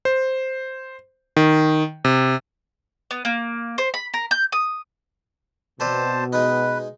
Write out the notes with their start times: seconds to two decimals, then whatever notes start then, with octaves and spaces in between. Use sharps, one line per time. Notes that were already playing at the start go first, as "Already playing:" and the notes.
0.05 C5
1.37 D#3
2.05 C3
3.11 B3
3.25 A#3
3.78 C5
3.94 B5
4.14 A#4
4.31 G6
4.52 D#6
5.80 B2 C4 B4 C5 D5 A5
6.33 G#3 D#4 B4